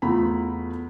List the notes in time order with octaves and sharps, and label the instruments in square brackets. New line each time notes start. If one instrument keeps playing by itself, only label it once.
[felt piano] E2 A3 F4 A#5 B5